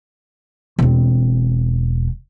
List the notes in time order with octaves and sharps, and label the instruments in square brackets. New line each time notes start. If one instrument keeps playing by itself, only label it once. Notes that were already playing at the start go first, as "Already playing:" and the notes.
[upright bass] E1 C4